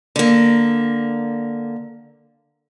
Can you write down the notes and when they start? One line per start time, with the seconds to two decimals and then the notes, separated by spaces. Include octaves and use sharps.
0.16 D3 A#3